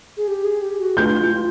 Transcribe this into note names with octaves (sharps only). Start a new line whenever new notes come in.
G#4
G4
G#4
G4
F#4
F4 G6
E4
F4